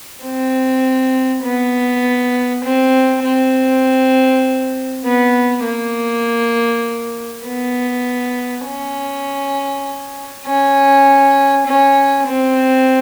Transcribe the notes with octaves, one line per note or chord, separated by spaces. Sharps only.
C4
B3
C4
C4
B3
A#3
B3
C#4
C#4
C#4
C4